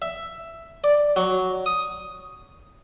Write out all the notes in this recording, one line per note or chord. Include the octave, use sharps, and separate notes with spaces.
E5
D5
F#3
D#6